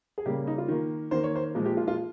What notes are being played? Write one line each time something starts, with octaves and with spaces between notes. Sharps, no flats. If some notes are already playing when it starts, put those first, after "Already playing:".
G#4
C#3 G3 A#3 G4
D#4
F4
D#3 A#3
D#3 A#3 C5
C#5
C5
A#2 F3 G#3
G4
F4
F4